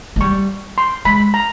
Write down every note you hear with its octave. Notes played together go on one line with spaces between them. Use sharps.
G#3
G3 C#6
C6
G#3 B5
A#5